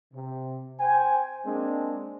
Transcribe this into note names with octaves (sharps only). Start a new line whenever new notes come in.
C3
C5 G5 G#5
G#3 A#3 C4 D4